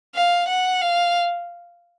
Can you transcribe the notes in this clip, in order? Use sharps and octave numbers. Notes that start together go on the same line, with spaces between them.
F5
F#5
F5